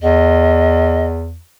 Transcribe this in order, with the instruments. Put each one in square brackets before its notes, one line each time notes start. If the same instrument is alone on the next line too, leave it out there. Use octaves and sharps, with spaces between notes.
[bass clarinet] E2 [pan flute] D#5